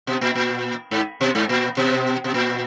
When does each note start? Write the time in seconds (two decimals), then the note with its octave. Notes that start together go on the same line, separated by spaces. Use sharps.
0.07 B2
0.21 A#2
0.35 A#2
0.91 G#2
1.21 B2
1.35 G#2
1.49 A#2
1.77 B2
2.24 B2
2.34 A#2